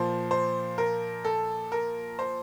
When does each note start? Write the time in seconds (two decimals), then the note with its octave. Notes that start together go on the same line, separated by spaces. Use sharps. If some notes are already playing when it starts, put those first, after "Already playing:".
Already playing: A#2 F3 C5
0.31 C5
0.78 A#4
1.25 A4
1.72 A#4
2.19 C5